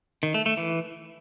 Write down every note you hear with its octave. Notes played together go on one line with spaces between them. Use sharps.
D#3
A3
A3
E3